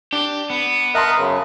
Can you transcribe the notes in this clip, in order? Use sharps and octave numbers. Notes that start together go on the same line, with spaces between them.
D4 G4
B3
A#4 D#5 E5 A5 C6 F#6
F#2 C#3